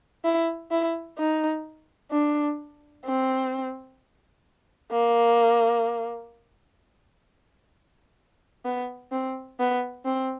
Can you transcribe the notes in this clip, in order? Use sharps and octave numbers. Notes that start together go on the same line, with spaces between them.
E4
E4
D#4
D4
C4
A#3
B3
C4
B3
C4